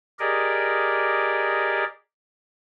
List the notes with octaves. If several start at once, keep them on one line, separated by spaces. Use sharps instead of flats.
G4 G#4 A#4 D5 D#5